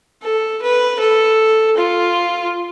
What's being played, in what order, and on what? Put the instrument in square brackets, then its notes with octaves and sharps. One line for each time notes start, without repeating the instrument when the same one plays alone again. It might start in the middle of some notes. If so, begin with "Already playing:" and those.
[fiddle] A4
B4
A4
F4